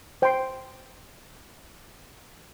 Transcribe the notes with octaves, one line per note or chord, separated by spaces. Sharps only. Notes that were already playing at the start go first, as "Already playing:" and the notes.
C5 G5 C6